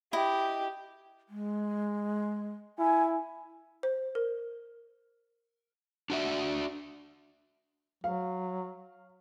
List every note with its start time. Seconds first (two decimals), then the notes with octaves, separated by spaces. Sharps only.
0.13 E4 G4 D#5
1.29 G#3
2.79 E4 G#5
3.83 C5
4.15 A#4
6.10 D4 F#4 D5 E5
8.04 F#3 F5